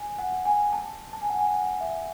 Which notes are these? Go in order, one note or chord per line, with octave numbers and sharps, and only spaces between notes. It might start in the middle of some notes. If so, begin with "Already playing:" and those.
Already playing: G#5
F#5
G#5
A5
A5
G#5
F#5
G#5
F#5
E5